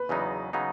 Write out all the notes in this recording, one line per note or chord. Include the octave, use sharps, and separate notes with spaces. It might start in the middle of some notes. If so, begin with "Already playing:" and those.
Already playing: B4
E2 C#3 F#3 B3 D#4
C#3 F#3 B3 D#4